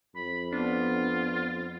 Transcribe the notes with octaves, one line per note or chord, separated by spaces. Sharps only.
F2 B5
B3 D4 F4